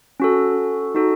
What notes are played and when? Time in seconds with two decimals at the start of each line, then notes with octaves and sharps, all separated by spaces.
0.20 C#4 F#4 A4
0.95 D#4 F#4 A4